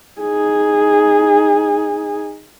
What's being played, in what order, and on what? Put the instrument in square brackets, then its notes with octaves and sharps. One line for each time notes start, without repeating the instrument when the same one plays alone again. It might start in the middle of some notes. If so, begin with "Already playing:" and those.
[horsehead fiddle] D#4 G#4